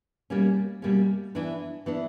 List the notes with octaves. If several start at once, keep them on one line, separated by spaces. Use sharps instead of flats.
B2 G3 A#3 C#4
B2 G3 A#3 C#4
E3 B3 D4
E3 B3 D4